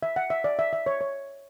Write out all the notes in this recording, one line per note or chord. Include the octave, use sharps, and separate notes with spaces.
E5
F#5
E5
D5
E5
E5
C#5
C#5